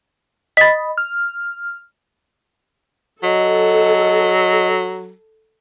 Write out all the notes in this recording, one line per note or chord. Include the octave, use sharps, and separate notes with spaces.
D#5 B5 A6 B6
F6
F#3 A4 D#5